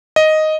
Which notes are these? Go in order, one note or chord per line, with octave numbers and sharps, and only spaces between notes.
D#5